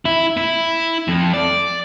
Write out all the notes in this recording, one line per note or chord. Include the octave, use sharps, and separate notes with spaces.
E4
E4
F2
D5